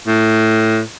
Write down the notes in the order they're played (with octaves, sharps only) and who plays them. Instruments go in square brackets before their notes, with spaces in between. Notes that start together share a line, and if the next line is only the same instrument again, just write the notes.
[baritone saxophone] A2